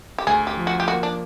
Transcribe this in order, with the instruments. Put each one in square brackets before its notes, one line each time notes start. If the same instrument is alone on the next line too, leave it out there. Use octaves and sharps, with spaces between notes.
[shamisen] G4
[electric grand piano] D2 [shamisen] G#4
[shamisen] G4
[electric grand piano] F3
[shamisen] F#4
G4
[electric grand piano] A#3 [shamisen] F#4
[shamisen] D4